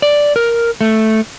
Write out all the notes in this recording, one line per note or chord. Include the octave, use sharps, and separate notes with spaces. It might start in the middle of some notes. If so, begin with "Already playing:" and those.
D5
A#4
A3